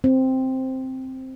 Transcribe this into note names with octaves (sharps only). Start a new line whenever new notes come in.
C4